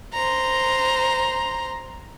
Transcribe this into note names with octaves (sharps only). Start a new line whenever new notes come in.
C5 A#5